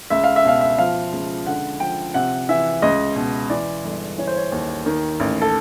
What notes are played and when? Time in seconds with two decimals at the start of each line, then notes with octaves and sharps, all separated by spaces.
0.10 C#2 E5
0.24 F5
0.36 E5
0.45 B2 F5
0.61 E5
0.79 F3 F5
1.13 C#2
1.46 D3 F#5
1.80 F3 G5
2.14 C3 F#5
2.49 E3 E5
2.82 C#2 D#5
3.16 B2
3.50 E3 D5
3.84 G1
4.18 E3 C#5
4.27 C5
4.36 C#5
4.52 D#2
4.86 D#3
5.20 A1
5.42 A4